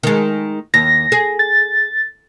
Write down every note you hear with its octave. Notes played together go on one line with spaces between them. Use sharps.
D#3 G#3
D#2 A#6
G#4
A6